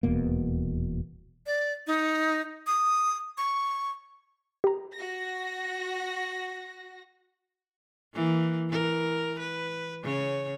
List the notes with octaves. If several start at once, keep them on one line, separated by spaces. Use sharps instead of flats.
D#1 E2 B2 A#3
D5
D#4
D#6
C#6
G4 A#5
F#4 A#6
E3 A#3
E3 A#4
B4
C#3 C#5